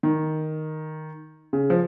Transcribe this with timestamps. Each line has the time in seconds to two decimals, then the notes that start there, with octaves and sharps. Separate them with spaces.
0.03 D#3
1.53 C#3
1.70 F3